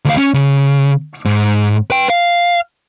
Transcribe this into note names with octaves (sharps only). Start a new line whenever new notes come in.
D2 F5
C#4
C#3
G#2
B4 G5
F5